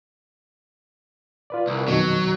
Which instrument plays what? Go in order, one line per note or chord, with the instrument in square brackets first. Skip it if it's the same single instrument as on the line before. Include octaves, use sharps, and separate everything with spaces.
[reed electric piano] F4 B4 D5
[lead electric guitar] C2
[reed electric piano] F2 B2 D#3 [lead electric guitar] F#3